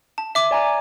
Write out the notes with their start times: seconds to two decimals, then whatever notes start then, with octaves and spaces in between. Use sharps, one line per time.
0.18 A5
0.35 E5 D6
0.51 D5 G#5 A#5